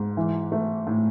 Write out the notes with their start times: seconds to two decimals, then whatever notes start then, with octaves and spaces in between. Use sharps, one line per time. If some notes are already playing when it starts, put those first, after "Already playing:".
Already playing: G#2
0.17 E3
0.52 A3
0.87 A2